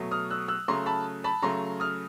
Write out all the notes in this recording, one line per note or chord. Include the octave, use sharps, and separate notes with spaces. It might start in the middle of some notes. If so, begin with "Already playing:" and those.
Already playing: B2 F#3 A3
D#6 F6
E6 F#6
E6 F#6
C#3 F#3 A3 A#5 C6
A5 B5
A5 B5
C#3 F#3 A3 A#5 C6
D#6 F6